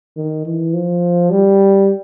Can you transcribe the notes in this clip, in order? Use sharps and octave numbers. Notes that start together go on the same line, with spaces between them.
D#3
E3
F3
G3